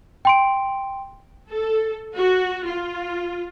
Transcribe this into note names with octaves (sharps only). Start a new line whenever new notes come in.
G5 C6 D7
A4
F#4
F4